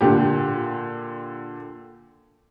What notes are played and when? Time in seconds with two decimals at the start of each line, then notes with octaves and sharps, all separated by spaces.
0.01 A#2 D3 G4